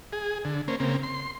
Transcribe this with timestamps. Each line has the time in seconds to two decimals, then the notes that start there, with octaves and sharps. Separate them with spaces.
0.13 G#4
0.45 D3
0.68 A#3 C#4 C5
0.80 C#3 A#3 C4
1.03 C6